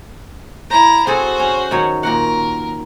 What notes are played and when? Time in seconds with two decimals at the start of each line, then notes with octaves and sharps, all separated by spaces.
0.70 E4 C5 A#5
1.07 C4 F#4 G#4 A4 C5
1.40 C#4
1.71 D#3 F#3 C#5
2.03 A#2 F#4 A#4 F#5